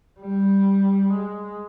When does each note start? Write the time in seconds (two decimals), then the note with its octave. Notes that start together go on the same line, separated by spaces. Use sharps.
0.20 G3
1.10 G#3